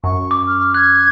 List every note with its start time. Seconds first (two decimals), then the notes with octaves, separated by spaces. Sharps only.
0.04 F#2 C#6
0.31 D6
0.47 F6
0.74 F#6 G#6